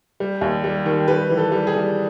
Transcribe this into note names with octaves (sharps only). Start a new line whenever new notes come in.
G3
D#2
G3
D#3
G3 B4
E3
A4
G3
G#4
G3